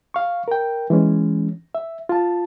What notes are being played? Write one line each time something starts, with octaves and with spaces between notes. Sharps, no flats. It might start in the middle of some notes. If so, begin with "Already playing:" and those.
F5 C#6
A#4 G5
E3 G#3 C#4
E5
F4 A5